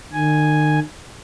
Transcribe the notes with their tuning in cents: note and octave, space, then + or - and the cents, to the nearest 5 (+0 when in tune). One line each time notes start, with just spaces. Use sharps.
D#3 -40 G#5 +0